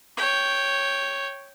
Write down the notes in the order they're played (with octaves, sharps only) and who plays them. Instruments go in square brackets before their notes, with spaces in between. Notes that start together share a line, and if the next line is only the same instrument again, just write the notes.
[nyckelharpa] C#5 G5